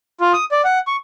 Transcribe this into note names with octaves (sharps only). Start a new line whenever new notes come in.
F4
D#6
D5
F#5
C#6